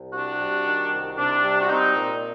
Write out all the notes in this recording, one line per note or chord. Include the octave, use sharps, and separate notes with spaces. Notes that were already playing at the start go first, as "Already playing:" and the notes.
Already playing: C2
C3 D4 F#4
G3
D#3
C2
C3 D4
G3
F#4
C4 D#4
A#2